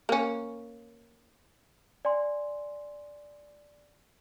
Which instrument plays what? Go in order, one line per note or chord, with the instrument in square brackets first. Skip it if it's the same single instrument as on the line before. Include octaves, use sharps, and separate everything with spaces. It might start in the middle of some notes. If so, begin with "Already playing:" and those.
[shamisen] A#3 C#4
[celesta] D5 G#5 C6